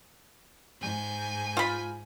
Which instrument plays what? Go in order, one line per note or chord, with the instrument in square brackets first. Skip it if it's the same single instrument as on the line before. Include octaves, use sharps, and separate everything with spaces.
[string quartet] G#2 G#5 G6
[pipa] F4 B5